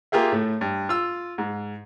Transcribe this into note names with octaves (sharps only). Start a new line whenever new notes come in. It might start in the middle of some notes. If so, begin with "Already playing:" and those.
A#3 F4 G4 G#4 E5
A2 A3
G2
F4 E6
G#2